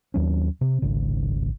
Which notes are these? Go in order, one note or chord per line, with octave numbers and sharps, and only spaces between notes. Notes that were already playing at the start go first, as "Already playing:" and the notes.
D#2 F#3 C#4
C3 C4
D1 G#1 G#2 C#3